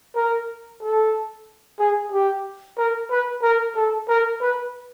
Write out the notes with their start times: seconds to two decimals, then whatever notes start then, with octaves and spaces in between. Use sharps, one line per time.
0.15 A#4
0.81 A4
1.79 G#4
2.12 G4
2.77 A#4
3.10 B4
3.42 A#4
3.75 A4
4.08 A#4
4.41 B4